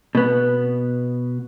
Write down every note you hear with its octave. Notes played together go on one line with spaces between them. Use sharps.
B2 B3